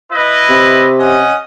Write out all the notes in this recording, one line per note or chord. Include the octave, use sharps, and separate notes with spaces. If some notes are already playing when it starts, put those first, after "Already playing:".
E4 B4 D#5
C3
C#4 D#5 F#5